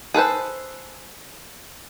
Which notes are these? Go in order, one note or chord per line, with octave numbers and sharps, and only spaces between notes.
G#4 A4 B4 C5